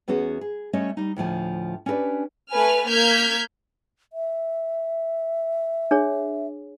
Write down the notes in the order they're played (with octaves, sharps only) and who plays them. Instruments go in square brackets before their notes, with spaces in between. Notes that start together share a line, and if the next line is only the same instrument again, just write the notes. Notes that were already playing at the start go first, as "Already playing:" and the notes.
[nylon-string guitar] E2 B3 C#4 F#4 G#4
G#4
G3 A3 C#4 C#5 D#5
G3 D#4
D2 A2 F3 G#5
C#4 D4 G4 A#4 B4 D5
[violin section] A3 B4 G#5 F6
A#3 F6 G6 G#6 B6
[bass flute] E5
[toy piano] D4 G#4 C#5